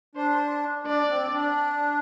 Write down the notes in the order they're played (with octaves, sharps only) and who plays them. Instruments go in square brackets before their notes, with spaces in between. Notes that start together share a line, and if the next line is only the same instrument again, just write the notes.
[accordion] D4 [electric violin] C5
[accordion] D4 [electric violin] D5
[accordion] C4
D4